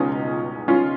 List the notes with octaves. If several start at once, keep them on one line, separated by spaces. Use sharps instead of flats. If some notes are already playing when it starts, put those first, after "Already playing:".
Already playing: C#2 B2 C#4 D#4 F4
C#4 F4